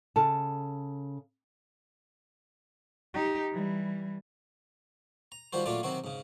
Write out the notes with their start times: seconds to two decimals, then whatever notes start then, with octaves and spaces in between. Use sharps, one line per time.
0.16 C#3 A4 A5
3.14 D#4 G4
3.52 E3 G3
5.32 A#5
5.53 D#3 F3 G3 F#4 C5
5.66 A#2 F#3 A3 D4 F4 D5
5.83 C3 D#3 F#3 C4 F#4
6.04 G#2 C#3